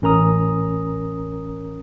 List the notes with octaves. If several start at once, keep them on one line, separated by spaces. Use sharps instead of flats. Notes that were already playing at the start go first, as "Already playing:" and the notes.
A1 C#4 A#4 A#5 D#6